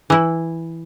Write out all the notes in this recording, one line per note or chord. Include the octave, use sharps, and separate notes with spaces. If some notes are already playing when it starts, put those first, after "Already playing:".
E3 E4